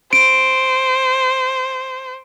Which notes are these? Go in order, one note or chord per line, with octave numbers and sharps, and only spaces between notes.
C5 D7